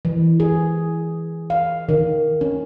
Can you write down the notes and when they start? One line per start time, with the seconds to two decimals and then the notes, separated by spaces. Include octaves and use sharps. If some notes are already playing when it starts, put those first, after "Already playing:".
0.05 E3
0.40 G#4
1.50 F5
1.89 D#3
2.41 C#4